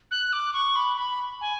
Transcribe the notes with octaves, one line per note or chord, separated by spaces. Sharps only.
F#6
D6
C#6
B5
B5
G#5